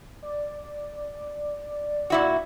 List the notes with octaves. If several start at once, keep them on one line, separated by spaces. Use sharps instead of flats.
D5
A#2 E4 F#4